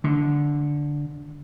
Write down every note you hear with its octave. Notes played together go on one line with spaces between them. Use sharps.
D3